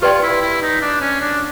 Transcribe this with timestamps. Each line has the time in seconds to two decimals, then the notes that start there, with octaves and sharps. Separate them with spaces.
0.02 F4 G4 B4 D5 G5 C6
0.13 F4
0.22 E4
0.41 E4
0.62 D#4
0.81 D4
1.01 C#4
1.21 D4